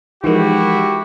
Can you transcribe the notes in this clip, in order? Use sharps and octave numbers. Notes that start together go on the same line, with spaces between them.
E3 F3 G#3 D#4 E4 F#4 G4 A#4